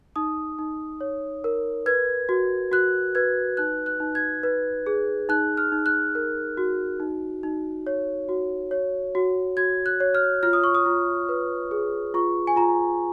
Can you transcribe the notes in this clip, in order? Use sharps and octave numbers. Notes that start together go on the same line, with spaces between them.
D#4 D#6
D#4
C#5
A#4
B4 G#6
F#4
F#4 F#6
B4 G#6
D#4 F#6
F#6
D#4
G#6
B4
G#4
D#4 F#6
F6
D#4
F#6
A#4
F#4
D#4
D#4
C#5
F#4
C#5
F#4
F#4 G#6
F#6
C#5
F6
F4 F6
D#6
C#6
D#6
F4
B4
G#4
F4 C#6
G#5
F4 A#5